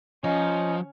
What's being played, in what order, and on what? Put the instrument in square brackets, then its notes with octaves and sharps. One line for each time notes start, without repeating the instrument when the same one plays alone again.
[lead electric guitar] F3 [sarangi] C#4 [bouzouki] D#4